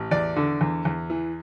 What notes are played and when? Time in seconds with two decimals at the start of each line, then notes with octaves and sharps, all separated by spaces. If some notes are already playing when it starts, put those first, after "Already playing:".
Already playing: A1
0.11 E2 D5
0.36 D3
0.61 E2
0.85 E2
1.10 E3